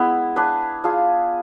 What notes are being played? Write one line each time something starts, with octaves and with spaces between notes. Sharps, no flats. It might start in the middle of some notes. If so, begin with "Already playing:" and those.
Already playing: G#3 B3 E4 G#4
D4 G#4 B4
D4 F4 G#4